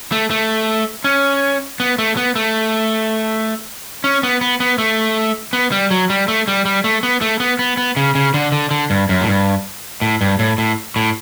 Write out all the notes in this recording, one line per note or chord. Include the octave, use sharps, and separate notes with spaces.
A3
A3
C#4
B3
A3
B3
A3
C#4
B3
B3
B3
A3
B3
G3
F#3
G3
A3
G3
G3
A3
B3
A3
B3
B3
B3
C#3
C#3
D3
D3
D3
G2
F#2
A2
G2
A2
G2
A2
A2
A2